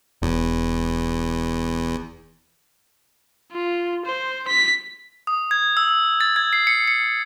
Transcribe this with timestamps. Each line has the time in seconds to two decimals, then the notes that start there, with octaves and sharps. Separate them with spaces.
0.22 E1 E2
3.52 F4
4.06 C5
4.48 B6
5.27 D#6
5.51 G#6
5.77 E6
6.21 A6
6.36 G#6
6.53 C7
6.67 C#7
6.88 C#7